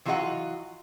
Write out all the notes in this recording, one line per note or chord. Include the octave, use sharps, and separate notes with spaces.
E3 F#3 F4 G#4 D#5 F#5